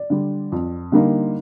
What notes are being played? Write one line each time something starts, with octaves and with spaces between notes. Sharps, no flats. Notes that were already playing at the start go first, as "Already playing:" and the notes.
Already playing: D5
D3 G3
F2
D3 G3 A#3 D#4